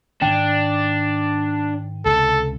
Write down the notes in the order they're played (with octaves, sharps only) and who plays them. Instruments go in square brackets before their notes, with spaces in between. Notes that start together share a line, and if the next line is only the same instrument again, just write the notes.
[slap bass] G#2 D#3 [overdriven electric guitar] D4 [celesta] G5
[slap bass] C#2 C3 [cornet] A4